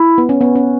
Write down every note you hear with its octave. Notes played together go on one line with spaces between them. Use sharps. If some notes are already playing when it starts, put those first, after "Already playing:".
Already playing: E4
B3
C#4
B3
C#4